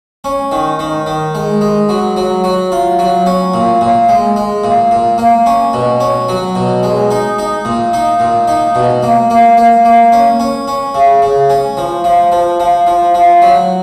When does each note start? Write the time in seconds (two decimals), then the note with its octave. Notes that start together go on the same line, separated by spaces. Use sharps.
0.24 C#4
0.52 D#3
0.79 D#3
1.06 D#3
1.35 G#3
1.61 G#3
1.89 F#3
2.17 F#3
2.44 F#3
2.72 F4
2.99 F#3
3.26 C#4
3.54 A#2
3.81 A#2
4.09 G#3
4.36 G#3
4.64 A#2
4.91 A#2
5.18 A#3
5.46 C#4
5.73 B2
6.00 C#4
6.29 F#3
6.55 B2
6.83 G#3
7.11 D#4
7.38 D#4
7.65 A#2
7.93 D#4
8.20 A#2
8.48 D#4
8.75 B2
9.03 A#3
9.30 A#3
9.57 A#3
9.85 A#3
10.12 C#4
10.40 C#4
10.68 C#4
10.95 C#3
11.22 C#3
11.50 C#4
11.77 F3
12.04 F3
12.32 F3
12.60 F3
12.87 F3
13.14 F3
13.42 F#3